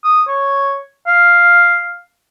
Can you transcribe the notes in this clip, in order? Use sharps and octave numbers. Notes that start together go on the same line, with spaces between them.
D#6
C#5
F5